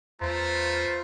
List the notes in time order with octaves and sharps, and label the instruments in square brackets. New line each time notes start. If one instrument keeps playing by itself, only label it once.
[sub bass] E2 [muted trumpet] A3 [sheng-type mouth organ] F4 C5 [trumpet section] B4 F5 A#5